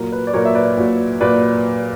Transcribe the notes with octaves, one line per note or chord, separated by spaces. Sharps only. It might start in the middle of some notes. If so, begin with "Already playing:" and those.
Already playing: A#2 F#3 A#4
B4
D5
A#2 F#3 A#4 C#5
E5
B4 D5
A#2 F#3
A#2 F#3 B4 D5